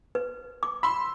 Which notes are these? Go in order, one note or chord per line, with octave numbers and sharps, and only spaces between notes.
B4
D6
B5 C6 E6